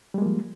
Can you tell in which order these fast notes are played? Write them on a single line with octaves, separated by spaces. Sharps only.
G3 G#3 A#3 F3